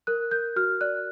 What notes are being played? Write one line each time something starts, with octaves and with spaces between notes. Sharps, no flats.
A#4 F#6
A#4 G6
F#4 F6
D5 F#6